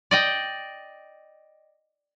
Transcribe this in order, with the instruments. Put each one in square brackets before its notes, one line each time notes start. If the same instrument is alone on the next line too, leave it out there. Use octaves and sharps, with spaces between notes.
[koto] D5 D#5 G5